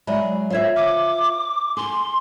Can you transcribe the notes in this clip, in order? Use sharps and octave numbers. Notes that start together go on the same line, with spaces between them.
F#3 G#3 D5 E5 B5
F4 C5 C#5 E5 G#6
D6 F6
G#4 C6